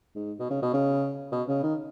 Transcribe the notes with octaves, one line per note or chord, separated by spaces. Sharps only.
G#2
B2
C#3
B2
C#3
B2
C#3
D#3